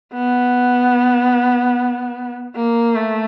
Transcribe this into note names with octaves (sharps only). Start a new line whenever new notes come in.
B3
A#3
A3